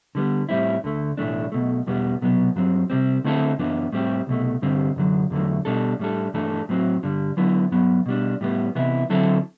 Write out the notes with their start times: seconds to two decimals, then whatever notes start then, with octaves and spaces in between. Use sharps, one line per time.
0.15 D3 G3 B3
0.49 A2 G3 C4 E4
0.84 D2 D3 A3
1.17 B1 A2 E3 A3 D4
1.52 B1 B2 A3
1.86 E2 B2 G3 B3
2.21 C2 B2 F#3 B3
2.56 G2 F#3 C4
2.90 C2 C3 G3 C4
3.24 D3 A3 C4 E4 A4
3.58 F#2 E3 B3 D4
3.92 A2 G3 C4 G4
4.27 C2 B2 A3
4.62 G2 D3 G3 C4
4.96 F#2 D3 F#3
5.30 E2 D3 F#3 A3
5.65 B2 G3 D4 A4
5.99 A2 G3 D4 A4
6.34 G2 E3 A3 D4 A4
6.69 A2 F#3 C4 F#4
7.03 G2 D3 G3
7.37 D3 F#3 B3 E4
7.71 G2 F#3 B3
8.06 B2 G3 D4
8.41 A2 G3 B3
8.75 C3 E3 B3 E4
9.10 D3 F#3 C4 E4 A4